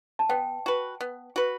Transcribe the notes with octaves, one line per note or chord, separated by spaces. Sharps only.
A5
B3 G5
F#4 B4
B3
F#4 B4